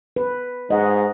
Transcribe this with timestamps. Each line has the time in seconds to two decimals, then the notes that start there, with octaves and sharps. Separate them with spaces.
0.16 B4
0.71 G#2 D#5 F#5